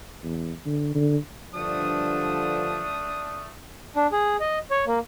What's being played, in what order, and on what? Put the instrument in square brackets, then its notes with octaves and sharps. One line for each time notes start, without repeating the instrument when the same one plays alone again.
[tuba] E2
D3
D3
[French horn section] G2 D3 F3 [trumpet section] A3 D4 D#6
[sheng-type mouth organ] D4
G#4
D#5
C#5
A#3